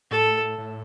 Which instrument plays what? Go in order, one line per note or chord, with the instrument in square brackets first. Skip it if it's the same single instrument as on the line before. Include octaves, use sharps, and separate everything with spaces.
[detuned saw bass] A2 [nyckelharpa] A4
[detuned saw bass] A2